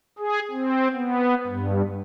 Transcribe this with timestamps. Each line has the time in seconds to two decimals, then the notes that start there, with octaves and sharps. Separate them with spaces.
0.19 G#4
0.51 C4
0.94 B3
1.47 G2